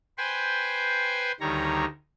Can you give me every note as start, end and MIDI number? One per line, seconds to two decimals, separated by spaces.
0.18 1.32 71
0.18 1.32 72
0.18 1.32 79
0.18 1.32 80
0.18 1.32 84
1.40 1.85 38
1.40 1.85 51
1.40 1.85 55
1.40 1.85 73
1.40 1.85 82